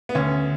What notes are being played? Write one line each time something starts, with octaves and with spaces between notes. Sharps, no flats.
B3
D2 C#4